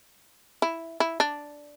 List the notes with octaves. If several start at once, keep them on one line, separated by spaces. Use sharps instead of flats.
E4
E4
D4